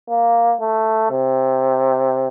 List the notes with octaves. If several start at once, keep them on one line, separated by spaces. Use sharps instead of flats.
A#3
A3
C3